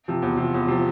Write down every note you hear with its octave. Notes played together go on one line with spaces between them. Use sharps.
C3 F3
E2
C3 F3
E2
C3 F3